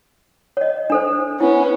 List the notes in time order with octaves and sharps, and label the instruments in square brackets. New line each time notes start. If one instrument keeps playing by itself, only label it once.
[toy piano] C#5 D#5
D4 A4 C5
[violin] B3 C#4 [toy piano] E4